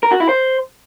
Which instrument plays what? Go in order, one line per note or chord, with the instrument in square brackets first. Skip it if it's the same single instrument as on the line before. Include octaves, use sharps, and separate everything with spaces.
[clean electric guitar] A#4
F#4
E4
C5